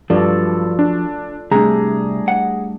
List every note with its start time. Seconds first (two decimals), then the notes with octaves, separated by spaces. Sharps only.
0.10 G2 F3 F#3 F4 A4 D5
0.79 D4
1.51 C3 G3 A3 D4 G#4 A#5
2.28 F#5